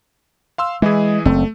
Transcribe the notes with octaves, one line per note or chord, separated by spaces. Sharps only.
F5 C6 E6
E3 G#3 E4 G#4
F#1 A3 C4